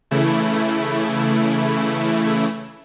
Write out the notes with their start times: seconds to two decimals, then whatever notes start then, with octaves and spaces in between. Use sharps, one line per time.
0.11 C#3 E3 A3 E4